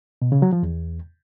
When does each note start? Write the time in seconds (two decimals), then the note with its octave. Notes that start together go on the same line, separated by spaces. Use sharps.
0.22 B2
0.32 C#3
0.42 F#3
0.53 F3
0.63 E2